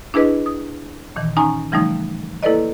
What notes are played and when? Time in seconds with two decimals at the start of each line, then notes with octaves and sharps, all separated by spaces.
0.14 D4 E4 G#4 B4 D#5
0.46 D#6
1.16 A#2 D#3 E3
1.37 C#4 D#4 G#5 A#5
1.72 C#3 E3 F3 G3 A3 D#4
2.43 A#3 E4 A4 B4 D5 D#5